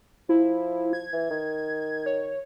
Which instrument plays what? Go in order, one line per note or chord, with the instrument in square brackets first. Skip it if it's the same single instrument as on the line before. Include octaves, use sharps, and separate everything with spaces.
[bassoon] F3 [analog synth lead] E4
[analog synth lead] G#6
[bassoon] E3
D#3
[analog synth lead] C#5